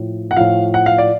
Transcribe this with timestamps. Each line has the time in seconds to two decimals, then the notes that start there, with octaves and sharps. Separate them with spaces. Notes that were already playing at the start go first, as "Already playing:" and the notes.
Already playing: A2 F3
0.31 F#5
0.36 A2 F3 F5
0.74 F#5
0.86 F5
0.98 D5